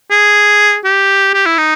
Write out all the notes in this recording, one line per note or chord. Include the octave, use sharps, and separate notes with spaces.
G#4
G4
G4
E4
D#4